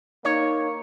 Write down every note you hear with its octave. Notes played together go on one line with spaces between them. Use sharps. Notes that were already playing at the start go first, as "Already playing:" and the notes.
A#3 D#4 C#5